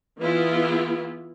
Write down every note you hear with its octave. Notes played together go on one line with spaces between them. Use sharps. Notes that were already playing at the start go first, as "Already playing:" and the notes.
E3 B3 E4 F4 G#4